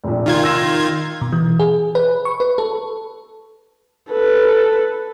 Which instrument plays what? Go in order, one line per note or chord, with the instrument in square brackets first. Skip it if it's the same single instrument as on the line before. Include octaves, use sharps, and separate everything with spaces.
[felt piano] F1 A#1
[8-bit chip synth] D#3 F4 G#6
[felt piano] E6 A#6 E7
[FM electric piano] B2
E3
G#4
B4
C#6
B4
A4
[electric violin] A4 B4